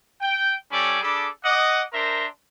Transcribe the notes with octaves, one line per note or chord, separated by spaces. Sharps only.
G5
G3 C#4 A4 G#5 B5 D6
D4 G#4 A4 B5 D6
D#5 F#5 D6
D4 A#4 C5 E5 A#5 C6